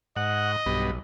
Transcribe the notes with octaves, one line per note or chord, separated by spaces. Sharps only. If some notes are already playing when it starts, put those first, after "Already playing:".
G#2 D#5 F#5
B1 G2 B3